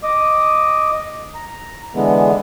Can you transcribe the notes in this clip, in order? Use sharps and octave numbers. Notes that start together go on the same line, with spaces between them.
D#5 D6 D#6
A#5
D3 E3 G#3 B3